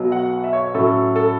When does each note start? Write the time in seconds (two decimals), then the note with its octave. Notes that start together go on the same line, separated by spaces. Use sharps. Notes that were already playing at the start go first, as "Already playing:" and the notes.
Already playing: B1 B2 F#3
0.12 F#5
0.44 E5
0.53 C#5
0.74 A2 F#3 C#4 A4
1.16 A4